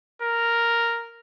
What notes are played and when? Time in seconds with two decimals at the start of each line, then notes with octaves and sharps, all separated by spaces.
0.22 A#4